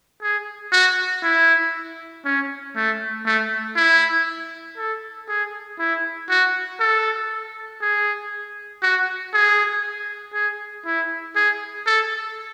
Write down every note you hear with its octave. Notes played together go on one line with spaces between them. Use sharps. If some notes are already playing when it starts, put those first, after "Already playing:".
G#4
F#4
E4
C#4
A3
A3
E4
A4
G#4
E4
F#4
A4
G#4
F#4
G#4
G#4
E4
G#4
A4